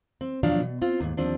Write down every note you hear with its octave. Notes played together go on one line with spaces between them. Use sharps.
C4
D#2 B2 F3 F#3 D4 F5
B2
C4 F4
D#2 G#2
D#2 F3 C4 D4